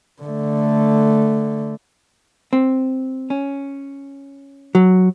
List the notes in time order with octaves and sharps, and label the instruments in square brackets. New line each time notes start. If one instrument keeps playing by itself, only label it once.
[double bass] D3 A3
[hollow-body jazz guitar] C4
C#4
F#3